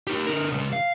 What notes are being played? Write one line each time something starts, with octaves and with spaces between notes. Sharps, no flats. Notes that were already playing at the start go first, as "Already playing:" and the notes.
D#4 G4
D3 A#4
C#3 G#3
F5